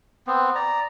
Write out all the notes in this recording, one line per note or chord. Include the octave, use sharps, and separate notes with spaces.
B3 C4
D5 A#5